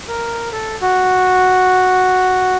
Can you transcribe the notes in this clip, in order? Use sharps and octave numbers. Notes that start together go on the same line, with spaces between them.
A#4
A4
F#4